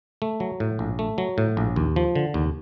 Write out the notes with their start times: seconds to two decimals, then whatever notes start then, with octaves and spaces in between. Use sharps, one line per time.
0.22 A3
0.40 F#3
0.60 A2
0.79 A#1
0.99 A3
1.18 F#3
1.38 A2
1.57 A#1
1.76 D#2
1.96 F3
2.15 D3
2.34 D#2